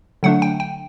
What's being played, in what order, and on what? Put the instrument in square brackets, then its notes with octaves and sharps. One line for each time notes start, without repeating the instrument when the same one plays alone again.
[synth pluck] D3 F#3 A3 D4 F#5
G5
G5